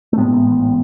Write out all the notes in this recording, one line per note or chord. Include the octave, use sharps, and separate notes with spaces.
A3
A2 G#3 B3
A1
A1
A2